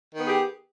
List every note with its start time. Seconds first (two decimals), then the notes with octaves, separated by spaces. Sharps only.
0.15 D#3
0.20 B3
0.24 G#4
0.29 G4